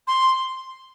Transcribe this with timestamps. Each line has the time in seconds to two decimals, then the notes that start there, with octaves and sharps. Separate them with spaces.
0.07 C6